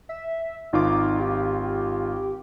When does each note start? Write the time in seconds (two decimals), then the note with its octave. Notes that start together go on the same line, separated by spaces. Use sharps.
0.09 E5
0.73 G#1 D#4 F4 D6
1.20 G4